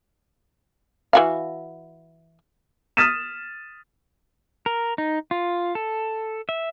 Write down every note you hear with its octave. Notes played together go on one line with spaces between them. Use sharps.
E3 F#4 F5
D#6 F6 A6 B6 D#7 E7
A#4
D#4
F4
A4
E5